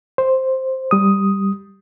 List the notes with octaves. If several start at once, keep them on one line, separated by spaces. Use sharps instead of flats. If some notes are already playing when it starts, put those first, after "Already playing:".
C5
G3 D#6